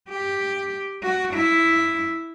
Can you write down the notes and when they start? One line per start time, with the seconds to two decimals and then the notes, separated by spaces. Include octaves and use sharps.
0.09 G4
1.03 F#4
1.34 E4